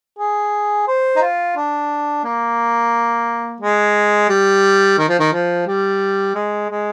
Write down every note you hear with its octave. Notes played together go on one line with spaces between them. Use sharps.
G#4
C5
D#4
F4
D4
A#3
G#3
G3
D#3
F3
D#3
F3
G3
G#3
G#3